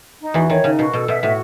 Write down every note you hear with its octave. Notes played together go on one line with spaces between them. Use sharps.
D#4
E2 E3 F#4
D#3 C#5
C#3 D#4
B2 F#4
B2 A4
B2 E5
A2 F#4